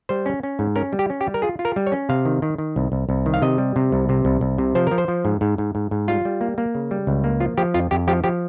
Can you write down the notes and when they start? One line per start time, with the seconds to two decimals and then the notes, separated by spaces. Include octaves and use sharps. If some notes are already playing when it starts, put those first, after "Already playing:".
0.09 G3 C5
0.26 C#4
0.43 C#4
0.59 G#2
0.76 C#4 A#4
0.93 G3
0.99 G4
1.10 C#4
1.21 G4
1.27 G3
1.34 A#4
1.42 F4 G#4
1.59 F4
1.65 A#4
1.76 G3
1.87 C#5
1.92 C#4
2.09 C3 F5
2.25 D#3
2.42 D#3
2.58 D#3
2.76 C2
2.92 C2
3.09 C2
3.26 D#3
3.34 F5
3.42 C3 D#5
3.58 G3
3.76 C3
3.92 C2
4.09 C3
4.25 C2
4.41 C2
4.58 C3
4.75 F3 C5
4.87 F3 A#4
4.98 C5
5.08 F3
5.25 G#2
5.41 G#2
5.58 G#2
5.75 G#2
5.91 G#2
6.08 G3 F4
6.25 G3
6.41 A#3
6.58 A#3
6.75 C#3
6.91 G3
7.07 C#2
7.24 A#3
7.40 F3 F4
7.57 F3 G4
7.74 F2 F4
7.91 F2 G4
8.08 F3 G4
8.24 F3 G4